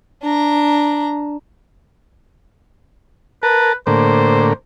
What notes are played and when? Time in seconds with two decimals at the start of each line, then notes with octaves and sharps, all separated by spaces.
0.22 D4 A#5
3.43 A#4 B4 A5
3.87 A2 D3 A#3 C5